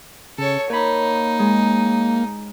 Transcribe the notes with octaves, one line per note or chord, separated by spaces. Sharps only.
C#3 A4 C#5
A#3 D#4 C#5 B5
G#3